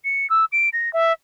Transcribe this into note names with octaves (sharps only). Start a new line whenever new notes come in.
C#7
E6
D7
A#6
E5